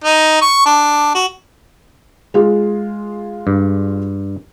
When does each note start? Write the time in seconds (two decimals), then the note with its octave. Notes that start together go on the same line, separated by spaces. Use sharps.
0.04 D#4
0.41 C#6
0.66 D4
1.15 F#4
2.34 G#3 F4 G#4
3.47 G2